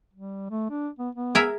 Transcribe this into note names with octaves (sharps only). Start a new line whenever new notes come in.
G3
A3
D4
B3
B3
G#4 A#4 E5